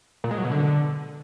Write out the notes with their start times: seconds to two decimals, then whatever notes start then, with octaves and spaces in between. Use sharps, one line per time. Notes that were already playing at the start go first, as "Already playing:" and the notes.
0.24 A#2
0.31 G#3
0.38 F#3
0.45 B2
0.51 D3